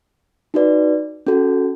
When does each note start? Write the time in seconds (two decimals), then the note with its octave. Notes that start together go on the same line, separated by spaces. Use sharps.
0.54 D#4 F#4 B4 D5
1.27 C#4 F#4 A4